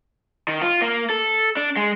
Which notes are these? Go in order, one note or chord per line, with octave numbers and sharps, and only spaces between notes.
D#3
F4
A#3
A4
D4
G#3